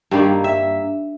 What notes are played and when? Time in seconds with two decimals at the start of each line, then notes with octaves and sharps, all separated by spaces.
0.11 G2 D#3 G3 A#3
0.44 E5